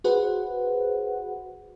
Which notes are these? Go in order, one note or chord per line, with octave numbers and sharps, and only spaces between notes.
F#4 G#4 B4 C5 F#5